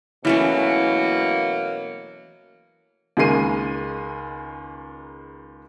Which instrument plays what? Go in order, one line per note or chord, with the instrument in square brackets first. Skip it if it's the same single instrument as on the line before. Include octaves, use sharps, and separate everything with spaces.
[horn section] B2 F#3 A#3 [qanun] E3 A3 C#4
[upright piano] C#2 D#3 G#3 A#3 C7 D#7